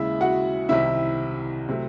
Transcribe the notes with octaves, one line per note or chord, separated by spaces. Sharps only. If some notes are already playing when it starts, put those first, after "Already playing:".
Already playing: D#2 C#3 G#3 E4 E5
F#4 F#5
C2 C3 D#3 E4 E5
C3 F#3 A3